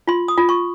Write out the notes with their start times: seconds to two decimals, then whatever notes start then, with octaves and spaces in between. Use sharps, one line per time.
0.07 F4 C6
0.28 D#6
0.38 F4
0.49 C#6